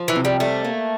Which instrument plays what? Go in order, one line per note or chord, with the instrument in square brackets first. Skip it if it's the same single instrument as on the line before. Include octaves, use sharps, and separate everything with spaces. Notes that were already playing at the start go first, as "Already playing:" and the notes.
Already playing: [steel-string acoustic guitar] F3
[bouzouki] E3
[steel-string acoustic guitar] C3
[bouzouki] G3
[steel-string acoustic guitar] G3 [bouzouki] A3
[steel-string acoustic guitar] A#3